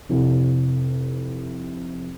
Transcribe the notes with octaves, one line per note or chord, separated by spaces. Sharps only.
F1 C3 E4